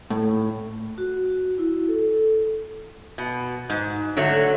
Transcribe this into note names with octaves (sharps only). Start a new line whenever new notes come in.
A2
F#4
E4
A4
B2
G#2
D3 F#3 A3 C#5